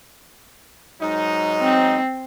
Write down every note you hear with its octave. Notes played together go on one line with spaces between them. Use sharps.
G#2 F#3 D#4
C4